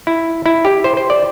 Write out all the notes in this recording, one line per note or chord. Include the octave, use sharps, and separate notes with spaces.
E4
E4
G4
C5
C5
D5